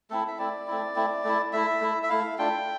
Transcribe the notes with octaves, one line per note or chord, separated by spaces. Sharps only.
A3 C4 E4 A4
E5
A3 C4 E4 D5
A3 C4 E4
A3 C4 E4
A3 E4
A3 E4 E5
A3 E4
E5
A3 E4 F5
A3 D4 F4 G5